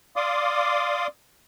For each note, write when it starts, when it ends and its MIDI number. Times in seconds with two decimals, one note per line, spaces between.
0.16 1.07 74
0.16 1.07 77
0.16 1.07 84
0.16 1.07 86
0.16 1.07 87